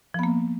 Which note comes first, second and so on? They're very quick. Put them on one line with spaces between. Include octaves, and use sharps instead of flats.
F3 B3 A#3